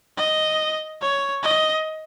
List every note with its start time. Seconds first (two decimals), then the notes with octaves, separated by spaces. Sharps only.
0.17 D#5
1.01 C#5
1.43 D#5